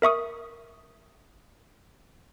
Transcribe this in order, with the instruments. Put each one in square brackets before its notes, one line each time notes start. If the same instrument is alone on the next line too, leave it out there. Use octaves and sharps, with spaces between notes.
[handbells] A#4 E5 C#6 D#6